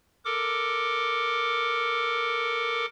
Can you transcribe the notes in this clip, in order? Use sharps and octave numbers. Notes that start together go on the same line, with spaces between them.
A4 A#4 D6